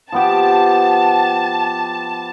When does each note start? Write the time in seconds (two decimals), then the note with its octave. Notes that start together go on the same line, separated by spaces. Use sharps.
0.12 F3 B3 G4 A5